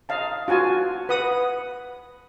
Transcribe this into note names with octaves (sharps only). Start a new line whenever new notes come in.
D#5 F5 A5
F4 F#4 G#5 A5
B4 F#5 D#6